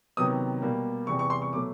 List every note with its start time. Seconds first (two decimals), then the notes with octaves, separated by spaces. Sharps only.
0.17 C3 D#3 F#3 B3 D#6
0.62 B2 G3 A#3
1.07 E2 C3 E3 G3 C#6
1.19 C#6
1.30 C6
1.42 C#6
1.53 B2 F#3 A3 D6